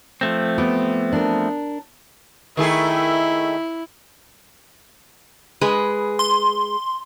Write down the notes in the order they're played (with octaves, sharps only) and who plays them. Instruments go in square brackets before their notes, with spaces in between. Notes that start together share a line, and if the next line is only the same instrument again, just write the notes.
[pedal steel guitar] F3 A3 C4
[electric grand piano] B3 [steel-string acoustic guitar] G4
[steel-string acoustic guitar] D4 A#4
[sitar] D#3 A3 G#4 [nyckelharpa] E4
[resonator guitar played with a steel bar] G#3 G#4 B4
[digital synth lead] C6